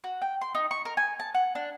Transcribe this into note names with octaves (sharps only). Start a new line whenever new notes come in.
F#4
G5
C6
D#4
C#6
A#4
G#5
A5
F#5
D4